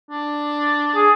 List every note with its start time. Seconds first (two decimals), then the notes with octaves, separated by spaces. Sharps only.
0.10 D4
0.96 G#4